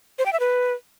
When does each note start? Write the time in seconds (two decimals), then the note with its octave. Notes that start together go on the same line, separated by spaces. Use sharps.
0.19 C5
0.26 G5
0.33 E5
0.40 B4